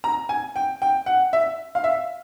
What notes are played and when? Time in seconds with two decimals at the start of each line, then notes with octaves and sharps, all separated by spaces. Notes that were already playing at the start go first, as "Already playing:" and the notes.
0.04 A#5
0.29 G#5
0.56 G5
0.82 G5
1.06 F#5
1.33 E5
1.75 F5
1.84 E5